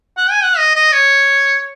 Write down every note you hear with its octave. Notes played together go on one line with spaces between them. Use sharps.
F#5
G#5
F#5
D#5
D#5
C#5